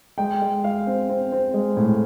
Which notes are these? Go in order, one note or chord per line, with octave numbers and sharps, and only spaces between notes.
G#3 G5
G#3
G#3 F5
C4
C4
C4
G#3
A2